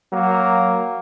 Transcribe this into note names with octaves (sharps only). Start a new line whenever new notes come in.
F#3 A#3